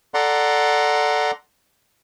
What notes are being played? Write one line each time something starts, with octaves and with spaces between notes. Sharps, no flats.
A4 D5 F#5 A#5 C6